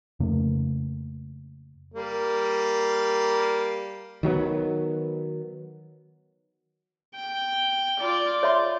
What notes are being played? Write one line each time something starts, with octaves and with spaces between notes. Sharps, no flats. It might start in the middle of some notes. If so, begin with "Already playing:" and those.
F2 C#3 A3 A#3
G3 A#3
D#3 F#3 G#3 B3
G5
F4 D5
C#5 E5 C6